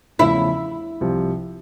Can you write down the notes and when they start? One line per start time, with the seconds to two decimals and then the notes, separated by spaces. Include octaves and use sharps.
0.19 E2 C#3 F3 A3 C#4 E4
1.01 C2 C3 F3